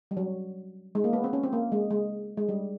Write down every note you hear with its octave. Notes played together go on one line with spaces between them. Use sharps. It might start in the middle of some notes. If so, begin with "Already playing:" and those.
G3
F#3
G#3
A#3
B3
C4
C#4
C4
A#3
G#3
G#3
G#3
G3